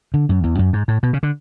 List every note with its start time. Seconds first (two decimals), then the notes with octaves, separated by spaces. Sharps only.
0.14 D3
0.29 F#2
0.44 E2
0.59 F#2
0.73 G#2
0.88 A2
1.03 B2
1.13 C#3
1.23 D3